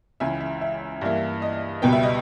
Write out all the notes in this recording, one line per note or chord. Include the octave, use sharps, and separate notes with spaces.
C#2 C#3 E3 E5 G#5
E5
E5
G2 E3 A#3 E4
D#5
C#2 B2 G3 B3 G5
E5
D#5